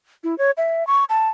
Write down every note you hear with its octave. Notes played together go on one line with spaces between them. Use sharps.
E4
C#5
E5
C#6
A5